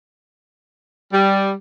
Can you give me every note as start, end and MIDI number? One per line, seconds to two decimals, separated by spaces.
1.13 1.51 55